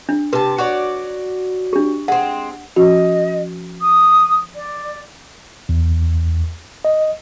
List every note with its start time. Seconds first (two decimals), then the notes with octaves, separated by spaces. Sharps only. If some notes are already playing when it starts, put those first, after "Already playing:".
0.09 D4
0.33 C3 B4 A5
0.58 F#4 C#5 D5
1.73 D4 G4
2.08 G#3 C4 F#5
2.76 F3 C#4 F#4 D#5
3.81 D#6
4.55 D5
5.69 E2
6.85 D#5